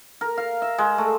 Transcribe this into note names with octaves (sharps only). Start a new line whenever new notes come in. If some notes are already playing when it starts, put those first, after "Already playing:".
A#4
F5
E5
G#3
A3